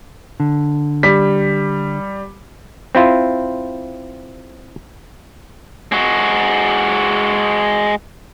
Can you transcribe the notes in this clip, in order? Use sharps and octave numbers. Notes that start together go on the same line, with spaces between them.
D3
G3 B6
C4 E4 F4
G#3 F#4